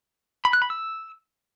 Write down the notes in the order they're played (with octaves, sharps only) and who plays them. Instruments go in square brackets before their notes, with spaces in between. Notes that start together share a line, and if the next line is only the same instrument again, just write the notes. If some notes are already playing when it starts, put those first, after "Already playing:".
[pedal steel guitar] B5
F#6
B5
E6